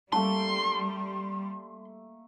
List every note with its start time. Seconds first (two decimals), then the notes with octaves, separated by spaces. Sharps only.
0.12 G3 A3 A#3 C#4 A5 C6 E6